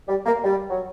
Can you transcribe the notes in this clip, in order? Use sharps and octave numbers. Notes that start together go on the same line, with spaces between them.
G3
A#3
G3
F#3